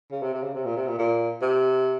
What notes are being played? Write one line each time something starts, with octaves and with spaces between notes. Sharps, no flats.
C#3
C3
C3
C#3
C3
A#2
C3
A#2
A#2
C3